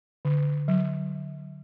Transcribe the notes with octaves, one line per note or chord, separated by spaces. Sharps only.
D3
F#3